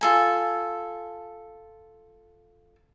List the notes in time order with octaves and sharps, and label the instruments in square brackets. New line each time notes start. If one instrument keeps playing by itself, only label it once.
[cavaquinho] F4 A4 G#5